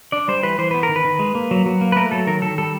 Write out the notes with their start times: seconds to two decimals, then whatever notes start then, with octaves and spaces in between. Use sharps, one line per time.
0.12 D4 D5
0.28 G3 C5
0.43 E3 B4
0.58 E3 C5
0.71 B3 B4
0.83 A#4
0.89 D#3
0.96 B4
1.05 D#3
1.19 G#3
1.35 A#3
1.51 F#3
1.66 F#3
1.81 A#3
1.92 B4
1.96 A3 A#4
2.11 F#3 A4
2.27 D#3 A#4
2.42 D#3 A4
2.58 G3 A4